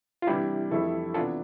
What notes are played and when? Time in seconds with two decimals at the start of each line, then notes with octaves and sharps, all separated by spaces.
0.22 F4
0.27 C3 E3 G3 D4 E4 G4
0.71 F2 E3 A3 E4 A4
1.14 C3 E3 B3 D4 F4 A4